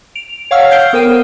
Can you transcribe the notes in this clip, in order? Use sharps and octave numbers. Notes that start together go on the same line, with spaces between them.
D7 F7
C#5 F5 F#5 C#6 E6 F6
F6 G6 C7 D7 G7
B3 A#4 C5 G5 D#7